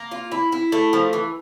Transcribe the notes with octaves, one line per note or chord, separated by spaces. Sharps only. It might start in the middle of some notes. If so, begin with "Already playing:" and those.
Already playing: A#3
F4
E4
E4
A3
F3
E3